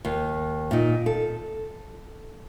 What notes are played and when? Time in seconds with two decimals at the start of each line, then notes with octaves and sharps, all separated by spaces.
0.05 D#2
0.71 A#2 D#4
1.06 A4